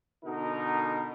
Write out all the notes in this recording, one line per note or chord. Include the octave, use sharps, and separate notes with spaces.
B2 D3 D#4 A#4